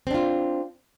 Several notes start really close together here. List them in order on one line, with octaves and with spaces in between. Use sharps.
C4 D4 F4